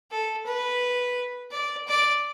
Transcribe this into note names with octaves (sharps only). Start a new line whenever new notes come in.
A4
B4
D5
D5